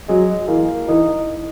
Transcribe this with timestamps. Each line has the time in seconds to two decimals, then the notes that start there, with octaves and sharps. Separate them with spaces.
0.08 F#3 G#3
0.48 E3 A#3
0.88 E3 D#4